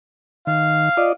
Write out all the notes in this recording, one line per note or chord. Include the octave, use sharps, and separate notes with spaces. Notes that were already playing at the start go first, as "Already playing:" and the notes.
D#3 F5
F4 D5 D#5